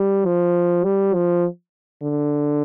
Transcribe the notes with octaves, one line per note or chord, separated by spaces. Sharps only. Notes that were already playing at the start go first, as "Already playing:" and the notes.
Already playing: G3
F3
G3
F3
D3